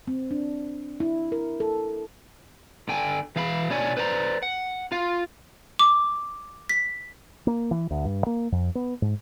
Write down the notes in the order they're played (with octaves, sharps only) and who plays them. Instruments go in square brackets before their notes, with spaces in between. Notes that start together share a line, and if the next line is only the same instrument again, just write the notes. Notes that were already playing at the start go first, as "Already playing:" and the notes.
[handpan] C4
D4
E4
A#4
A4
[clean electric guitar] D3 G5 G#5
E3 F5 B5
B2 D4 C#5 D5 G#5
B4 C5 D5 G#5 A#5
F#5
F4 F5
[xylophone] D6
B6
[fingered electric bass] A#3
E3
D2
G2
A#3
F2
B3
G#2